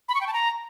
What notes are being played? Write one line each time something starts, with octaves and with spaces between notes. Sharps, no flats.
B5
C#6
G5
A5
A#5